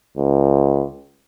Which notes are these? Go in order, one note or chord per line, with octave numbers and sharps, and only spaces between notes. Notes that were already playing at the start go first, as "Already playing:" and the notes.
C#2